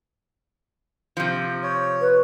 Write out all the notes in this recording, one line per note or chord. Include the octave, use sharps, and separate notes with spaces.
C3 F3
C#5
B4